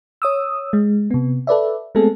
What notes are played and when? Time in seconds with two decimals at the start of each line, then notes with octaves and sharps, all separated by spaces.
0.22 C#5 D#6 E6
0.73 G#3
1.11 C3 B3
1.47 A4 B4 D5 E5
1.95 G#3 A3 B3 C4 G#4 A4